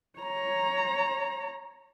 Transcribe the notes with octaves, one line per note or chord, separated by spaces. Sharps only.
C#5 A#5